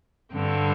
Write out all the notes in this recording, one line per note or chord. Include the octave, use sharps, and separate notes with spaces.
G2 D3 G3 C4